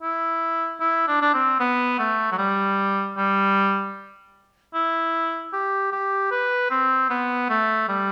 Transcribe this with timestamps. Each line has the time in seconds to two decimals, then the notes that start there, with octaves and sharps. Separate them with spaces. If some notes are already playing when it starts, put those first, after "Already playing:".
0.02 E4
0.81 E4
1.08 D4
1.22 D4
1.34 C4
1.60 B3
1.99 A3
2.31 F#3
2.38 G3
3.17 G3
4.74 E4
5.53 G4
5.92 G4
6.31 B4
6.70 C4
7.10 B3
7.49 A3
7.89 G3